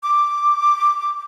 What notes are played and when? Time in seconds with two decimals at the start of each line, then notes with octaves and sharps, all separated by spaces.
0.03 D6